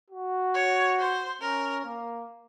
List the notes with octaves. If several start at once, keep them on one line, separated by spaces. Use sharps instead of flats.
F#4
C#5
C5
C#4 A#4
A#3